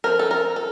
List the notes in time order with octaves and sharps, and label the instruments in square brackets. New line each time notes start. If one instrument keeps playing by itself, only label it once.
[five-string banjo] F3 C4 A#4
A4
A#4
A4